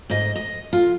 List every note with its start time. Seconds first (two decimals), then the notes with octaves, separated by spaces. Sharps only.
0.10 G#2 D#5
0.35 D#5
0.73 F4